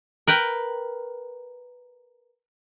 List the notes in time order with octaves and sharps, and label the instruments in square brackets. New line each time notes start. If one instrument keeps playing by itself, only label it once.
[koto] A#4 B4 G5